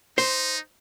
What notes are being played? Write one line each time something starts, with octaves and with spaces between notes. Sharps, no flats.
D#4 C5